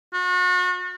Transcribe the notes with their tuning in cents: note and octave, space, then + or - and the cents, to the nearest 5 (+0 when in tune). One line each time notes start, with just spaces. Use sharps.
F#4 -35